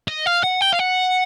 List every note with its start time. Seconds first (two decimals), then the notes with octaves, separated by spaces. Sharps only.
0.08 D#5
0.26 F5
0.44 F#5
0.61 G5
0.73 F5
0.79 F#5